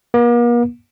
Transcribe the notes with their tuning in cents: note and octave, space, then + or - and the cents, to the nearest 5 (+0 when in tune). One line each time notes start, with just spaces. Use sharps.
A#3 +45